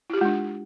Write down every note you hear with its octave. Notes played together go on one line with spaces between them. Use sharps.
G#3 D4 E4 F4 G4